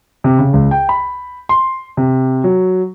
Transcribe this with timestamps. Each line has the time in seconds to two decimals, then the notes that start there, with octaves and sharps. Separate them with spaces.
0.24 C3
0.39 C#3
0.53 C#2
0.71 G5
0.89 B5
1.49 C6
1.97 C3
2.44 F#3